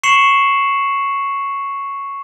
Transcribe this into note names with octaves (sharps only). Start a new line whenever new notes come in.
C#6 C7 C#7 E7 F#7